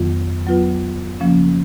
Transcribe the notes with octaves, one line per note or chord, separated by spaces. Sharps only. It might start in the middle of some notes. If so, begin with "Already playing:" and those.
Already playing: F2 D#3 F#3 B3 F4
F#3 B3 F4 B4
C#3 F3 A#3 C#4